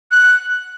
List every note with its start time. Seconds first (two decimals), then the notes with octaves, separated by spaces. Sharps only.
0.11 F#6